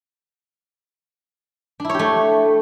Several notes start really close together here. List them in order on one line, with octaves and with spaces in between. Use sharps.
D4 E4 C#5 G4 A3